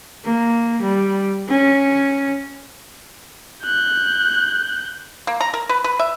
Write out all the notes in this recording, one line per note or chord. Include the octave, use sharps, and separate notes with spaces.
A#3
G3
C#4
F#6 G6
A#3
A#5
A#4
B4
B4
E5